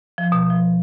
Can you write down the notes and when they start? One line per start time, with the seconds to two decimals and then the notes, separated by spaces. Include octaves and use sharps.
0.18 F3
0.32 B2
0.50 F3